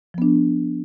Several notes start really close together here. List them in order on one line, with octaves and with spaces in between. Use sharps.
F3 B3 D4